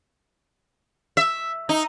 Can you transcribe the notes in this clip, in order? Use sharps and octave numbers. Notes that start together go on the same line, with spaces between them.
E5
D#4